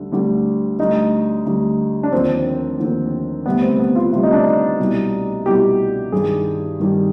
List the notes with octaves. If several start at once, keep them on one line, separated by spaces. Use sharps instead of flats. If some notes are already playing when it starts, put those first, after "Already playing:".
Already playing: D2 D3 G3
D2 D3 G3
D2 D3 G3 D#4
D2 D3 G3
D4
D#2 D3 F3 C4
D#2 D3 F3
D2 C3 G3 B3
C4
B3
F4
D2 C3 G3 F4
D#4
D4
D#4
C2 B2 G3
C2 B2 G3 G4
G2 D#3 G3 G#4
G2 D#3 G3